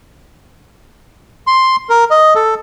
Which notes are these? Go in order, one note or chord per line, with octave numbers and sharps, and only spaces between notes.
C6
A#4
D#5
A4